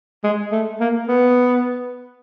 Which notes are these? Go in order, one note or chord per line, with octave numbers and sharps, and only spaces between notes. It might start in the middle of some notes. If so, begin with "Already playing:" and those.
G#3
A3
A#3
B3